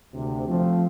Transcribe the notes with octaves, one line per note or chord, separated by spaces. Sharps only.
D2 C3
F3 A3 C4